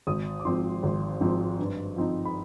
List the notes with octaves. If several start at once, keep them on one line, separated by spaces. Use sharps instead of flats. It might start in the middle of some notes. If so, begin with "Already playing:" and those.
G#1 D#6
D6
G#2 F3 C4 C6
G#1
G#2 F3 C4
G2
F3 C4 D#4
B5